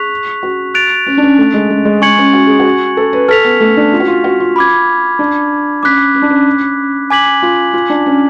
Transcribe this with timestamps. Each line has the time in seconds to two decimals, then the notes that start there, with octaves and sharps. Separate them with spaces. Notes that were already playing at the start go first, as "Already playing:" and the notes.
Already playing: G#4 C#6 F#6 B6 F7
0.43 F#4
0.74 F#6 A6 D7 F7
1.07 C#4
1.17 D4
1.22 C#4
1.38 A3
1.54 G#3
1.70 G#3
1.85 G#3
2.02 G#3 G#5 C#6 G#6 C#7 F#7
2.18 C#4
2.33 F#4
2.47 G#4
2.60 F#4
2.97 A4
3.13 B4
3.28 A4 F6 B6 F7
3.44 B3
3.60 A3
3.77 D4
3.93 F4
4.00 F#4
4.07 F4
4.24 F#4
4.40 F4
4.56 B5 D6 G#6
5.19 D4
5.83 C#4 D6 F#6 B6
6.15 C#4
6.22 D4
6.30 C#4
7.10 G#5 D6 G#6 B6 F#7
7.42 F4
7.73 F4
7.90 D4
8.06 C#4